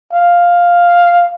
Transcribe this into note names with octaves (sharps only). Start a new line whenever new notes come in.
F5